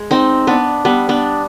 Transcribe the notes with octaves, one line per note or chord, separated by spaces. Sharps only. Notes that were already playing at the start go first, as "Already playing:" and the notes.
Already playing: G#3
C4 D#4
B3 D4
G3 B3
B3 D4